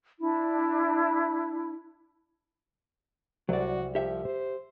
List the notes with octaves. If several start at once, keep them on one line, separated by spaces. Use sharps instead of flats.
D4 E4
C2 F#3 F#4 D5
F3 G4 E5
C5